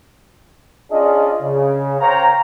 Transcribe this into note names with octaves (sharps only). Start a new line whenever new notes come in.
C#4 D4 F4 G#4 D5 D#5
C#3
A#4 C5 C#5 F5 G5 A#5